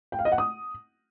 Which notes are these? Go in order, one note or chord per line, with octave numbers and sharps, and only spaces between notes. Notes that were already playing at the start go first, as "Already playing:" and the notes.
G5
F5
D#5
F#5
D#6